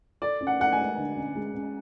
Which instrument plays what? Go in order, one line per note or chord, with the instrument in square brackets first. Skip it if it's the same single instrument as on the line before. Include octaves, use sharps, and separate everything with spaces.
[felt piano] A4 [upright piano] D5
[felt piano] C#4
[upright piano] F#5
[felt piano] A4 [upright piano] F#5
[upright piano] G#5
[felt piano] G#3
D3
C#4
G#3
C#4